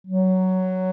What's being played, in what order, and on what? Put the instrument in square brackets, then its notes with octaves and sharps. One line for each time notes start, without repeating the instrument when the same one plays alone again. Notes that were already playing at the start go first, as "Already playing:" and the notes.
[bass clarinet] F#3